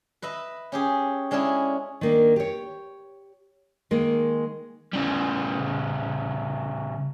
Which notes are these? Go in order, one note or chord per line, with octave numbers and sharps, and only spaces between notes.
B4 D#5 E5 B5
C#4 G4 G#4
G#3 C#4 D4 E4 G#4
D#3 A#3 D4
G4 C#5
D#3 G#3 A#3
C#3 G3